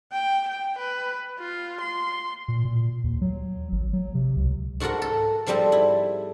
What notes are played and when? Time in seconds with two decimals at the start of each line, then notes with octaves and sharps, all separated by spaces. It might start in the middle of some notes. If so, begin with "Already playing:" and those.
0.12 G5
0.48 G5
0.78 B4
1.39 F4
1.81 C6
2.48 A#2
2.65 A#2
3.04 D#2
3.21 F#3
3.72 G#1
3.93 F#3
4.14 C3
4.36 C#2
4.80 G#2 F#4 A4 A#4 F#5
5.02 A4
5.46 G#2 F3 G3 C4 A4
5.72 E4